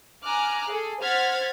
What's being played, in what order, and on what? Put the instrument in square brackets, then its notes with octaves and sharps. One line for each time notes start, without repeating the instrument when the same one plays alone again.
[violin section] G#5 A#5 D6 F6 F#6
G#4 A4
C5 F#5 F6 G#6 A6 B6